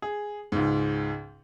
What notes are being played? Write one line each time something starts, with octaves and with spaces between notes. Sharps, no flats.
G#4
C#2 G#2